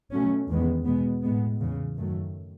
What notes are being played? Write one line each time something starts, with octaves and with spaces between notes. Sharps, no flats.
B2 F#3 A3 C#4
E2 D#3 G#3 B3
B2 G#3 B3
A2 G#3 B3
E2 C#3 E3
F#2 D#3 F#3 A3